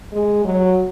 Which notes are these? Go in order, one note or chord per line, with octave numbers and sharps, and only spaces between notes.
G#3
F#3